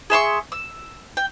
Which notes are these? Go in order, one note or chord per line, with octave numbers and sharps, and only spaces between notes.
G#4 E5 C6 C#6
E6
G5